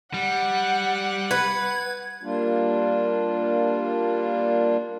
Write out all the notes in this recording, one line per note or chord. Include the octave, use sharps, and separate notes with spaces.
G3 F#5
B4 G#6
G3 A#3 D4 F4